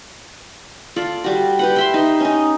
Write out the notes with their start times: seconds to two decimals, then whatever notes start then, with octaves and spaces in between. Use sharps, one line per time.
0.96 F4 A4 D5
1.24 G3 F#4
1.59 G4 B4 F#5
1.76 E5 B5 C6
1.94 D#4
2.20 C#4 D#4